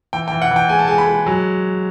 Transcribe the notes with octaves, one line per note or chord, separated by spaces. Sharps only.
E3 G5
G5
E3
F#5
E3
G5
G#3 G#5
A5
G#3 G#5
B5
G#3
F#3